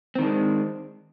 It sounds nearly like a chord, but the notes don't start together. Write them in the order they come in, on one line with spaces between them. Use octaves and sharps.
C4 D#3 D4 G#3